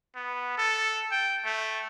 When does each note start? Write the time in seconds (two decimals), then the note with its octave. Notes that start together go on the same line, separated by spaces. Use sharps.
0.16 B3
0.58 A4
1.12 G5
1.45 A3